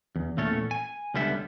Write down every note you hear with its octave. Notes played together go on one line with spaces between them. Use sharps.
E2
E2 A#2 A3 C#4 A4 C#5
G#5
C#2 D3 G3 B3 E5